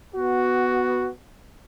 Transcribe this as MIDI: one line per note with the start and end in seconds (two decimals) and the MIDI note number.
0.16 1.10 59
0.16 1.10 66